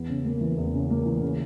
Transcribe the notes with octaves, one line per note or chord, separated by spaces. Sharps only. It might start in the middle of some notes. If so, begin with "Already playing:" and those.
Already playing: E2 B3
C#3
A#3
E3
E2
C#3
A#3
E3
C#3